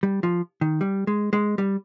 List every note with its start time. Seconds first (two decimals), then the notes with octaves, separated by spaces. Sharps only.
0.03 G3
0.23 F3
0.61 D#3
0.81 G3
1.07 G#3
1.33 G#3
1.58 G3